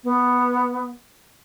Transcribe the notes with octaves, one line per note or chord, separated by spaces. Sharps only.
B3